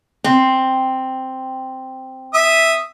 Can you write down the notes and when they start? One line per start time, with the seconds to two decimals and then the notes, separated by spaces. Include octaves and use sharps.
0.24 C4
2.34 E5 D#6